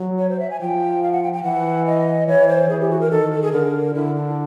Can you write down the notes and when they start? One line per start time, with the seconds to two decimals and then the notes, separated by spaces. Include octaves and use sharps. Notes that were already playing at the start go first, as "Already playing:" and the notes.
Already playing: F#3
0.19 C#5
0.30 C5
0.40 E5
0.50 G#5
0.61 F3 G5
1.03 F5
1.12 F#5
1.23 G5
1.33 G5
1.43 E3 F#5
1.86 D#5
2.28 E3 C#5
2.48 C5
2.69 E3 G#4
2.80 G4
2.90 F#4
3.00 A#4
3.11 D#3 A4
3.32 A4
3.42 G#4
3.53 D3 A#4
3.94 D3 E4
4.16 D4